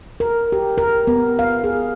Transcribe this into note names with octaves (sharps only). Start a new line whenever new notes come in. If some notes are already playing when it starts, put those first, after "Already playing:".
A#4
G4
A#4
B3
F5
G#4